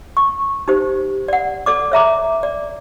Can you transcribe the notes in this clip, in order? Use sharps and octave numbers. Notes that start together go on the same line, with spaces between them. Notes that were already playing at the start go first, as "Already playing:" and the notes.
C#6
D#4 G4 C5
D5 F#5
A4 D5 D6
C#5 E5 A#5 D6
D5